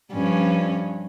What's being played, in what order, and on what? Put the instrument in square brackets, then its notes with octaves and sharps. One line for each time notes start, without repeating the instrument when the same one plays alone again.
[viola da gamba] G2 F3 C#4